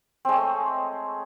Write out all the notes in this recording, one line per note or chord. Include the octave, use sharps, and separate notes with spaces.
G#3 A3 C4 C#5